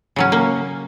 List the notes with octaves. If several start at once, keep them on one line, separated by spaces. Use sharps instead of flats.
C#3 F#3 C#4
A#3